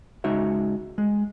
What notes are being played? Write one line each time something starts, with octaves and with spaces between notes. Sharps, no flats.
C#2 G#3 D#4 F#4 E5
G#3